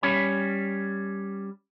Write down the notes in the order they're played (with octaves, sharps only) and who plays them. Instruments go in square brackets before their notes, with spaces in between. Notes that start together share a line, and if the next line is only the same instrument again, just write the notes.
[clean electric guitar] G3 C#4 C#5 B5